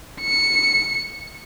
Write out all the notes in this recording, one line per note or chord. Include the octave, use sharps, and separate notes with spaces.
C#7